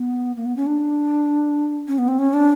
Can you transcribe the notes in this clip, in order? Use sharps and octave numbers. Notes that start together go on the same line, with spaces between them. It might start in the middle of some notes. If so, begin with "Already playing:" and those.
Already playing: B3
A#3
B3
C#4
D4
C#4
B3
C4
C#4
D4